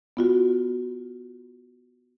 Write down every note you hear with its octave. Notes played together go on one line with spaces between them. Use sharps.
B3 F4 F#4